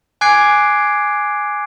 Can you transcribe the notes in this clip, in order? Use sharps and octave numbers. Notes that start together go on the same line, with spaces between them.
G#5 D6 F#6 G#6 C7 D7